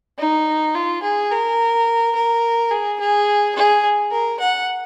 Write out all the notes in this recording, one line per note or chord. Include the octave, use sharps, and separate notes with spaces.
D#4
F4
G#4
A#4
A#4
G#4
G#4
G#4
A#4
F#5